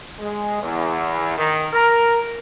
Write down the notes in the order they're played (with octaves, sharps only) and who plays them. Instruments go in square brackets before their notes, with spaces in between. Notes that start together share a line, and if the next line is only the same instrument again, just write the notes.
[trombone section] G#3
E2
D#3
A#4